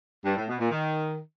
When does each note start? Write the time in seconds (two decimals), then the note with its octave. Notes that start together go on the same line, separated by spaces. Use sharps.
0.25 G2
0.37 A2
0.48 B2
0.60 A#2
0.71 D#3